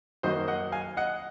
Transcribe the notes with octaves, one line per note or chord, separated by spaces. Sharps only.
F#2 D#3 F#3 A#3 C5 D#5
D#5 F#5
F5 G#5
D#5 F#5